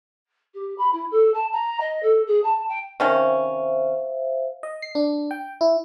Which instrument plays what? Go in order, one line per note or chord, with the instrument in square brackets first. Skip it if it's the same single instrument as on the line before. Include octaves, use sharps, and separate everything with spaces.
[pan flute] G4
B5
E4
A4
A5
A#5
D#5
A4
G#4
A5
G5
[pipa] C3 D#3 C#4 [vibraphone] C5 E5 F5
[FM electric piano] D#5
C7
D4
G5
E4